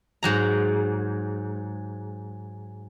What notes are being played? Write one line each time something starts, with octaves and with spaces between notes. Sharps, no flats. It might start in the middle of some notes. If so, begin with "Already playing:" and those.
G#2 F#3 A#5